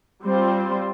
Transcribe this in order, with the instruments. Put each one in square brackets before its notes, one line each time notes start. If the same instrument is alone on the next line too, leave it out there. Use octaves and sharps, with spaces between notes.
[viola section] G3 C4 F4 C5